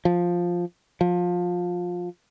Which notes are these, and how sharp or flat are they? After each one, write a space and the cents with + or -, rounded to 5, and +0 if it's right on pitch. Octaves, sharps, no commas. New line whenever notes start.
F3 +5
F3 +20